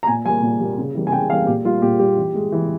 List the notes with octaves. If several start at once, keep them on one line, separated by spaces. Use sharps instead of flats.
A#5
A#2 G#5
G3 A#3 G#5
A#2
G3 A#3
C#3
E3 G3 A#3
G#5
C#3 G5
E3 G3 A#3 F5
A#2 G4
G3 A#3 F4
A#2 G4
G3 A#3 G4
E3
G#3
E3